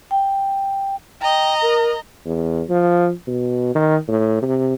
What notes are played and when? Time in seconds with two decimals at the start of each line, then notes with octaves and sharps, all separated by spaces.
0.11 G5
1.22 D#5 G5 A#5
1.62 A#4
2.26 E2
2.69 F3
3.27 B2
3.75 D#3
4.08 A2
4.42 C3